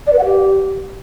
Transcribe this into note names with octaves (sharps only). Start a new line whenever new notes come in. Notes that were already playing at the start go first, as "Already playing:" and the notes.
D5
B4
F#5
G4